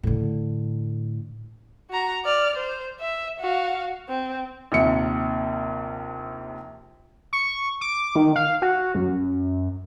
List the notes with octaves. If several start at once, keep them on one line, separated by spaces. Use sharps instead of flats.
A2 D3
F#4 A#5
D5 F6
C5
E5
F#4 F5
C4
A#1 D#2 C3 C#7
C#6
D6
D#3
F5
F#4
F#2